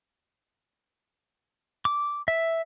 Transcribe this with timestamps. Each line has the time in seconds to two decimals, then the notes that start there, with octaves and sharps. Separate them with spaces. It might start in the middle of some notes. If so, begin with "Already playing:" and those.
1.85 D6
2.28 E5